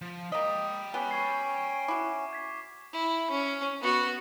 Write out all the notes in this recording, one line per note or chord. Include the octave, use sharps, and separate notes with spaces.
F3
A#3 D#5 G5 B5
B3 C#4 G4 B4 G7
C#6 G#6 C7
E4 F#4 D6
G#6 B6
E4
C#4
B3 F#4